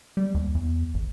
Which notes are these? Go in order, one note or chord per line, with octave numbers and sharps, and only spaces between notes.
G3
D#2
E2
G#1